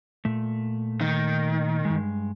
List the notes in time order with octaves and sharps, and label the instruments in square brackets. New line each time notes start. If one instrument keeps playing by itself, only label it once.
[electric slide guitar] A#2 A3
[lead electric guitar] D#3
[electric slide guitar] G2 G#3